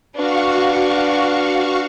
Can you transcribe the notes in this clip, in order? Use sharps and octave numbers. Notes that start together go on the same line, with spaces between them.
D4 F#4 B4 F5 C#6